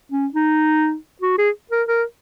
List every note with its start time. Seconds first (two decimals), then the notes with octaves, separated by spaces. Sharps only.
0.12 C#4
0.34 D#4
1.22 F#4
1.38 G#4
1.71 A#4
1.88 A#4